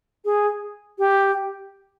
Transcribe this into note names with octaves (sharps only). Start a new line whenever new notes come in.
G#4
G4